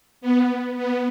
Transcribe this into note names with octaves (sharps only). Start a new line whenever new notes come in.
B3
B3